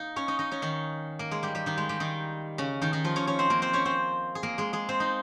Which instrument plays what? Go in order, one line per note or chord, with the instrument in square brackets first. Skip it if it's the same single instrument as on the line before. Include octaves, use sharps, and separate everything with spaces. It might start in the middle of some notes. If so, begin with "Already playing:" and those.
Already playing: [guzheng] A#3 D#4
C#4 C#5
D#4 D#5
D#4 D#5
C#4 C#5
D#3 D#4
A#3 A#4
G#3 G#4
G3 G4
G3 G4
D#3 D#4
G#3
G3 G4
D#3 D#4
C#3 C#4
D#3 D#4
D#3 D#4
F3 F4
C#4 C#5
C#4 C#5
C4 C5
A#3 A#4
C4 C5
C#4 C#5
C4 C5
G#4
A#3 A#4
G#3 G#4
G#3 G#4
C4 C5
D#4 D#5